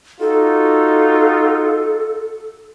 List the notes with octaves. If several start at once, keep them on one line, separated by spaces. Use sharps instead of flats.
D#4 F4 F#4 A4